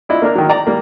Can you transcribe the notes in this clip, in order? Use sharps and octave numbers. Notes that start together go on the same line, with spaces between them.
D4 E4 F4 D#5
A#3 D4 A#4
D#3 F#3
D5 A#5
G3 A#3